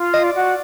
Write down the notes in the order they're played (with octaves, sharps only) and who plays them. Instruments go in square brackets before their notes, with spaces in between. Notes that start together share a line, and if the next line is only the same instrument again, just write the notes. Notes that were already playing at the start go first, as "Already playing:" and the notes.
Already playing: [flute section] F4
[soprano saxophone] D#5
D5
[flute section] F#4